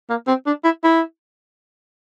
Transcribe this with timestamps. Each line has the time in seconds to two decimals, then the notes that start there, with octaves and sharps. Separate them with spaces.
0.10 A#3
0.27 C4
0.46 D4
0.64 E4
0.84 E4